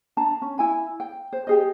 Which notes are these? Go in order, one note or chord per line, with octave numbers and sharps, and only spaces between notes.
D4 A5 A#5
C#4
E4 G#5 B5
G5
C5
G4 G#4 D#5